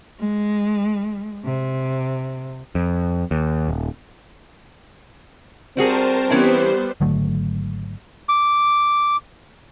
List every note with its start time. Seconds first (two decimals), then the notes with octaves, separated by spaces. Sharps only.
0.19 G#3
1.45 C3
2.75 F2
3.31 D#2
3.68 D#1
5.77 G3 C4 F#4 G#4 A#4 C5 A5
6.30 E3 G3 B3 C#4 E4 C5
7.01 G#1 D3 F#3 A3
8.29 D6